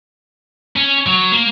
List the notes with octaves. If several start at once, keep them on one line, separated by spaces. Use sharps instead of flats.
C#4
F#3
A#3